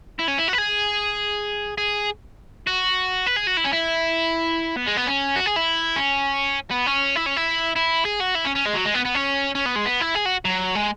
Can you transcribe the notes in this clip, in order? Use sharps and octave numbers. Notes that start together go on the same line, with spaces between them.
E4
C#4
E4
F#4
B4
G#4
G#4
F#4
B4
G#4
F#4
E4
C#4
E4
B3
G#3
B3
C#4
F#4
G#4
E4
C#4
B3
C#4
E4
C#4
E4
E4
G#4
F#4
E4
C#4
C#4
G#3
F#3
G#3
B3
B3
C#4
C#4
B3
G#3
B3
E4
G#4
F#4
F#3
G#3